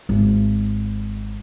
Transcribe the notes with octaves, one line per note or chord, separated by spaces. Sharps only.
G#1